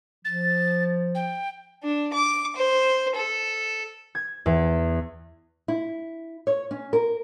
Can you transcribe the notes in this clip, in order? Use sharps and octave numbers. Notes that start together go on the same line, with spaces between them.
F3 A6
G5
D4
D6
C5
A4
G#6
E2
E4
C#5
C#4
A#4